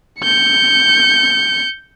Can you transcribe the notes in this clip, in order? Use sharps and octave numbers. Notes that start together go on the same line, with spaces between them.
G6 C#7